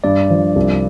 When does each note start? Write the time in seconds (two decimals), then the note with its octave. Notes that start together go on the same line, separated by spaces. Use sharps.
0.04 G2 D5
0.30 F3
0.56 C2